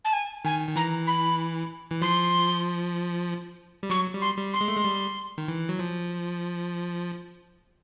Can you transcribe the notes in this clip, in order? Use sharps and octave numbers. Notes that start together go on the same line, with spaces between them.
A5
G#5
D#3 G#5
D#3
E3 A#5
B5
E3
F3 C6
G3
F#3 C#6
G3
C6
G3
C6
G#3
A3
G#3
G3
D#3
E3
F#3
F3